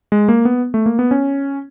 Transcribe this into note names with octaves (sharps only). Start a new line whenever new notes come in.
G#3
A#3
B3
A3
A#3
B3
C#4